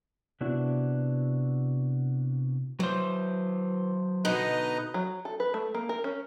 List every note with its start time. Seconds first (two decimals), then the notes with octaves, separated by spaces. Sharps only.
0.41 C3 B3 D4 E4 F#4
2.80 E3 F#3 C5
4.25 B2 D3 D#4 B4 D#5 A#5
4.94 F#3
5.25 A4
5.40 B4
5.54 A3
5.74 A#3
5.89 A#4
6.04 C#4